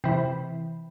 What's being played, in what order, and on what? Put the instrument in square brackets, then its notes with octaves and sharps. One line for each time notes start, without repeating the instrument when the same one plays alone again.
[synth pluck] C3 E3